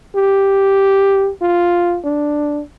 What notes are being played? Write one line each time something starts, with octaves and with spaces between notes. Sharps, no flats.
G4
F4
D4